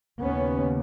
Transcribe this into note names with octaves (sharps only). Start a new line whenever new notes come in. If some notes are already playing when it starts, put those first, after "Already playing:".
D#2 C#3 B3 C#4